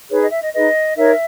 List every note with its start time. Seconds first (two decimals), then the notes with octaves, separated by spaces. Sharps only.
0.10 D#4 G#4 B4 C#5
0.21 D#5
0.31 E5
0.43 D#5
0.53 D#4 G#4 B4 D#5
0.96 D#4 A#4 C#5 E5